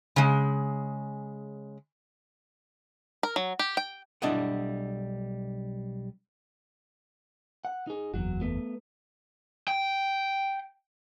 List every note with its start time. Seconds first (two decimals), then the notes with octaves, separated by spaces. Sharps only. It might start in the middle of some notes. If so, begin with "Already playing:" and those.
0.16 C#3 G#3
3.23 A#4
3.36 F#3
3.59 G4
3.77 G5
4.22 B1 G3 D4 E4 D#5 F#5
7.65 F#5
7.87 D#4 G#4
8.14 F#1 E2 F#3 F#4
8.41 A3 B3
9.68 G5